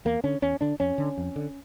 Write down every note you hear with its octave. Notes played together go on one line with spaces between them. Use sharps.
E2 A#3
D3 C#4
E2 C#4
D3 D4
F2 C#4
D3
F2
D3